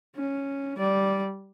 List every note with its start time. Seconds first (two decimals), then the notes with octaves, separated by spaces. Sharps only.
0.16 C#4
0.78 G3 D5